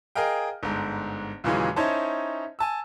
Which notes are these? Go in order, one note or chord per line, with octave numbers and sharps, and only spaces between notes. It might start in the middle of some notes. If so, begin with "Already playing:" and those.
G#4 A#4 D#5 F5 G5
G1 G#2
D#2 A#2 C#3 E3 F#3 G#3
C#4 D#4 E4 C5 C#5 A5
G#5 A5 E6